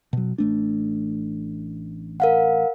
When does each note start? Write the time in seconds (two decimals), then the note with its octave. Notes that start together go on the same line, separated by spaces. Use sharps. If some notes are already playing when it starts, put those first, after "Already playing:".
0.13 B2 F#3
0.38 A1 A3 D4
2.20 A#4 F5 F#5